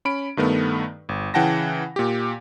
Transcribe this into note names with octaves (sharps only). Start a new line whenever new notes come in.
C#4 B5 D7
G2 D#3 A3 B3
G1
C#3 E3 F#5 G5 A5 A#6
A#2 G4